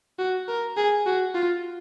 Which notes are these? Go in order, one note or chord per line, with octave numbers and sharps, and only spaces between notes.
F#4
A#4
G#4
F#4
F4